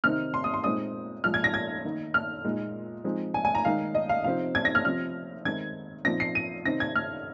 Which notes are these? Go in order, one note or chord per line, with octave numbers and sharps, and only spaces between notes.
C3 D#3 C4 D#4 F6
C6
D#6
C6
A#2 G#3 C4 D#4 D#6
A#2 F3 G#3 F6
G#6
A#6
G#6
D#3 A#3 D#4
F6
A#2 G#3 D#4
F3 G#3 C4 D#4
G#5
G#5
A#5
D#3 G#3 D#4 F5
D#5
F5
C3 F3 C4 D#4 F5
G#6
A#6
F6
C3 F3 C4 F6
D#3 G#3 C4 D#4 G#6
A#2 F3 C4 D#4 A#6
C7
D#7
C3 D#3 C4 D#4 A#6
G#6
F6